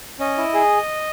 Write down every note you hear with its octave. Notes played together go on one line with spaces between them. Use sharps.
C#4 D#5
E4
G#4